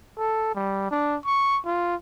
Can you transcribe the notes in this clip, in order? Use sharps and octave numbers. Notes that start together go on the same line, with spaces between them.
A4
G3
D4
C#6
F4